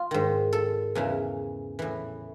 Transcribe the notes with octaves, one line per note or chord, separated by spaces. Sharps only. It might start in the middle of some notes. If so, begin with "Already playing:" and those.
Already playing: F4
G#2 D#3
A4
E2 C#3 E3
A2 E3